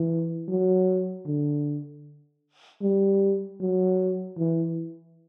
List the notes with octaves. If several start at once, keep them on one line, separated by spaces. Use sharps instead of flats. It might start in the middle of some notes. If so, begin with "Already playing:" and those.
Already playing: E3
F#3
D3
G3
F#3
E3